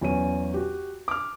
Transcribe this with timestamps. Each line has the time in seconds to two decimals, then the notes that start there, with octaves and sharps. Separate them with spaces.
0.01 E2 F#3 C#4 D#7
0.54 F#4 G4
1.08 D6 F6